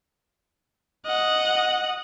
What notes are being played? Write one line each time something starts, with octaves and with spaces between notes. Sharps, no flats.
D#5 F#5